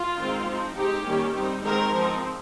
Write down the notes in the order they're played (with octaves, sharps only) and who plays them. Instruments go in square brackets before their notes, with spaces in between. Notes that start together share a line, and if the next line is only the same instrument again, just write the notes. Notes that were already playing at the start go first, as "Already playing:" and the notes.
Already playing: [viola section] F4
D#3 G#3 C4 D#4
F3 C4 D#4
G#3 C4 D#4 G4
D#3 G3 A#3 C#4
G3 C4 D#4
D#3 G#3 C4 D#4 A#4
F3 C4 D#4